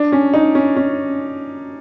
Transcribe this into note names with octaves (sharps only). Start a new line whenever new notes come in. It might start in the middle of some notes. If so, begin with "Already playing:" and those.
Already playing: D4
C#4
D#4
C#4
C#4